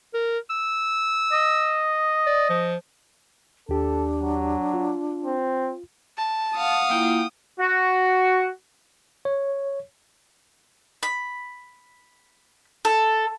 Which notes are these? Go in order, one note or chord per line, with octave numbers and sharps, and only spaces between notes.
A#4
E6
D#5
D5
F3
D#2 D4 G4 A4
F#3
F4
C4
A5
F5 F#5 D#6
A#3 E4 F4 G5
F#4
C#5
B5
A4